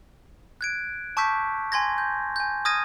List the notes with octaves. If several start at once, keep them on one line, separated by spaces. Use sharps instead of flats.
F#6 G#6 D7
A5 C#6 D6 E6 G6 B6
G#5 C6 G#6 A#6
G6
G#5 G6
D#6 F6 G#6 A#6 D#7